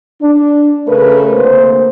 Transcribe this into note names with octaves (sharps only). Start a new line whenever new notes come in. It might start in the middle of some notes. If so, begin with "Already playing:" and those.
D4
C#3 A3 A#4 B4
D2 C3 A#3 C5